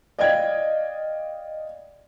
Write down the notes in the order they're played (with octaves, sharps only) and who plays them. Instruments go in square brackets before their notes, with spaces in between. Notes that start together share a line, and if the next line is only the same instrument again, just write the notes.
[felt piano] D5 D#5 F5 G5 G#6